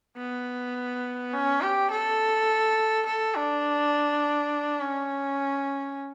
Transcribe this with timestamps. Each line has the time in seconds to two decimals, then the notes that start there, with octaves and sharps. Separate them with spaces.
0.17 B3
1.33 C#4
1.62 G4
1.91 A4
3.06 A4
3.35 D4
4.80 C#4